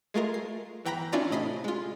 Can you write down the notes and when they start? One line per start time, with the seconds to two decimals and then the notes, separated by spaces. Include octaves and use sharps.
0.14 G#3 A3 F4 A#4
0.34 C7
0.85 G1 E3 G5 A#5 B5 A#6
1.12 C#4 D4 E4 F4 D5 A#5
1.30 A2 C3 D#5 B5 C7
1.64 G#3 F4